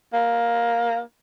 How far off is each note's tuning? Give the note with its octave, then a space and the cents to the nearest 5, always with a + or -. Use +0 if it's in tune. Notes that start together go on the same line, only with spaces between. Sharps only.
A#3 +10